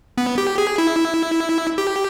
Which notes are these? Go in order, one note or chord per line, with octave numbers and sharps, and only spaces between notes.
B3
G4
G#4
E4
G4